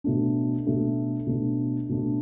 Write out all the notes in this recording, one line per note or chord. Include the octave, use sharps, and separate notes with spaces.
B2 A3 D4
B2 A3 D4
B2 A3 D4
B2 A3 D4